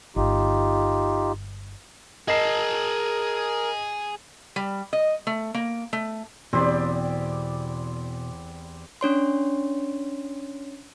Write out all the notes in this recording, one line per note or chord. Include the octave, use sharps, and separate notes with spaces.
G1 D#4 F4 G4
G#4 A#4 D#5 A5 C7
G3
D#5
A3
A#3
A3
E2 B2 C4 G4 C5 D5 C7
C#4 D4 C#5 C6